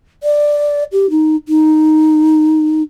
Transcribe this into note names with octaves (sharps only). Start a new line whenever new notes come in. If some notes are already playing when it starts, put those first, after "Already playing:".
D5
G4
D#4
D#4